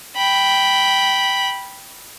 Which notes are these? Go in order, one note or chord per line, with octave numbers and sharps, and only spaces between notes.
G5 B5